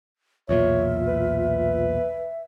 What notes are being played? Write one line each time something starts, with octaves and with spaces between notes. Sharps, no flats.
B1 E2 A#2 F4 C#5 E5
B4